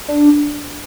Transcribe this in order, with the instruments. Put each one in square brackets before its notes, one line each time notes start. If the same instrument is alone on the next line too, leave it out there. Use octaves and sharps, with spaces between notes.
[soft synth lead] D4